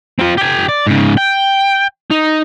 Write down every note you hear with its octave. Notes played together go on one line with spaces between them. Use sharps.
C4 F4
G4 G#5
D5
G#2 C#3
G5
D#4